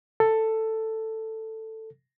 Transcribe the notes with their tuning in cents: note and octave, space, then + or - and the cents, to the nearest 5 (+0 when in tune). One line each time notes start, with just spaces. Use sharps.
A4 +10